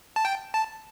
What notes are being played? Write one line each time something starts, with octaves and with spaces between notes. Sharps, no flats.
A5
G5
A5